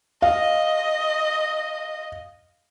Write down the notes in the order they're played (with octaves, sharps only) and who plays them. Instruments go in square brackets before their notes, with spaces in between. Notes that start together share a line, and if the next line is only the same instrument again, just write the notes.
[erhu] D#5 [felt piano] F5